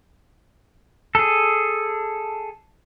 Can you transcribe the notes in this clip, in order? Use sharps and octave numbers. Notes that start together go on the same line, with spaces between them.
G#4 A4